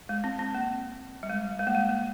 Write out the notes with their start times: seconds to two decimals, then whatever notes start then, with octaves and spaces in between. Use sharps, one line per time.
0.09 G#3
0.24 C4
0.39 C4
0.55 A#3
1.23 G3
1.30 G#3
1.59 G#3
1.67 A#3
1.75 G#3
1.89 A#3